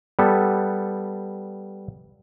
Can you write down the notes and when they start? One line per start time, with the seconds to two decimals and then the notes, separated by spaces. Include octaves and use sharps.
0.19 G3 B3 A4